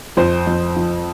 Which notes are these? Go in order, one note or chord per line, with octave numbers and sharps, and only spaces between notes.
F2 C5
F2
F3